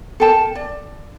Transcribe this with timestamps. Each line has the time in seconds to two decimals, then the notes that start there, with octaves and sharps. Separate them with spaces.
0.20 A4 A#4 G5 A5
0.55 D5